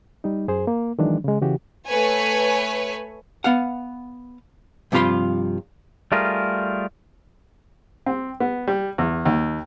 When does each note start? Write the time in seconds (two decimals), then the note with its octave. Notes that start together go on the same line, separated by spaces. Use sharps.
0.24 G3 D#4
0.48 F#2 G#4 C5
0.67 A#3
0.99 D#3 E3 F#3 G#3 D4
1.24 C#3 G#3
1.42 C#3 E3 F#4 G4
1.87 A3 B4 C#5 G#5
3.44 B3 F5 F#5
4.92 G2 C3 F3 F4 B5 C6
6.12 G3 A3 F4 G#4 A#4
8.06 C4
8.40 B3
8.68 G3
8.98 E2
9.25 D#2